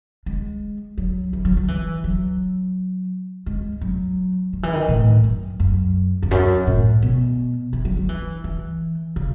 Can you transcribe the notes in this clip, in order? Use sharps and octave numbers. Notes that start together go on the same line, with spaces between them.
G#3
F#3
E3
F#3
F#3
E3
F#3
G#3
F#3
D#3
E3
D#3
A2
F#2
F#2
E2
F#2
A2
B2
E3
F#3
F#3
E3
E3
C#3